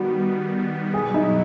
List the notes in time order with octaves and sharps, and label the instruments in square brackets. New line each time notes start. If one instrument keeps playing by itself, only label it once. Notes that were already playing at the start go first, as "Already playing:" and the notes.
Already playing: [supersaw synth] D#3 G3 B3 [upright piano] F#4
[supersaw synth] B2 F#3 B3 E4 [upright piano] G#4
[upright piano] D#4